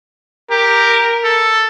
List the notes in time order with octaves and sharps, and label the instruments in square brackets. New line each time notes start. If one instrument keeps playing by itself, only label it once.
[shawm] G4 [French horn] A#4
[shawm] A4